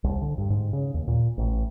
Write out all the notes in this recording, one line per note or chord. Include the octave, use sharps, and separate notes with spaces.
C2
D3
G2
G#2
C#3
D#2
A#2
A1